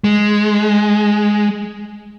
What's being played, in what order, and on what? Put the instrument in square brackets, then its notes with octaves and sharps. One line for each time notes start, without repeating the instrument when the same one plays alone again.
[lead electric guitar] G#3